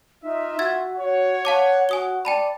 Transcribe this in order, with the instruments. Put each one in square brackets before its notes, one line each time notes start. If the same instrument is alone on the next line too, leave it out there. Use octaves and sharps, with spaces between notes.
[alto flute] D#4 [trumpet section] F4 E5
[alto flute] F#4 [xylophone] E6 G#6 A6
[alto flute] F#4 [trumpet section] C#5
[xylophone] F5 A5 D6 [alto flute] F#5
[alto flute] F#4 [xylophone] G#5 D#6 G7
[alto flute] D5 [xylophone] G5 A5 B5